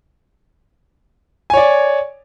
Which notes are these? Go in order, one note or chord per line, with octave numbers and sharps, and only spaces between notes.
C#5 D5 G#5